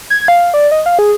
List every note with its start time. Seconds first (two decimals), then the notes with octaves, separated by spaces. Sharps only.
0.10 G#6
0.28 F5
0.54 D5
0.71 D#5
0.86 F5
0.99 G#4